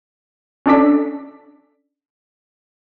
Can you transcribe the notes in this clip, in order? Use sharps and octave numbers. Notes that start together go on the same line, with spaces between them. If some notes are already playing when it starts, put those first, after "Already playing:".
C#4 D4 A4 D5 B6